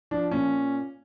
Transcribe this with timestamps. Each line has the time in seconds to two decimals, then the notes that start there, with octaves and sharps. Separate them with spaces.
0.11 F3 D4
0.31 A#2 C#4